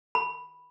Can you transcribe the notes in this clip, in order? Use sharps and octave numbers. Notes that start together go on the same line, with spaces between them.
B5